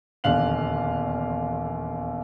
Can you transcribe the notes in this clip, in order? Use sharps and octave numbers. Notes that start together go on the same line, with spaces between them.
D#1 E2 D3 F5 F#6 F#7